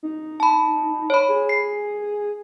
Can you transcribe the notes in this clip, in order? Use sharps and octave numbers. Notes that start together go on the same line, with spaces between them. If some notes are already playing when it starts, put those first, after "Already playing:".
D#4
A5 B5
C#5 B5
G#4
C7